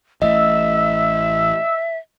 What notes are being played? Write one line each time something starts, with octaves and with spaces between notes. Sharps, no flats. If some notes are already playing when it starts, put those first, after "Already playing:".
A1 A2 D#5 E5 E6